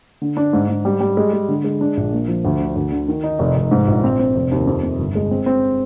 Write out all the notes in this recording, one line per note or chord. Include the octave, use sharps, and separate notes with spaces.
D3
D4
G#2
G#2
G3
G3
G#3
G#3
D3
G#3
D4
A#1
A#3
F3
D2
D3
D2
D3
D#3
D#4
F1
F1
G#2
A#1
C4
C4
F1
D#2
F2
C3
G1
G#3
C4
C4